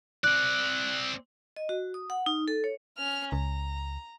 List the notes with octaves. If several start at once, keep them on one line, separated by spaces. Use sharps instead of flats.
C4 D5 F#6
D#5
F#4
D#6
F#5
D#4
A4
C#5
C#4 F6
C#2 A#5